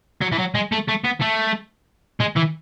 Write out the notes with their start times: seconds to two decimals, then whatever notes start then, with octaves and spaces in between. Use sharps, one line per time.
0.22 F#3
0.32 E3
0.39 F#3
0.55 G#3
0.72 A3
0.88 A3
1.04 B3
1.21 A3
2.21 G#3
2.37 E3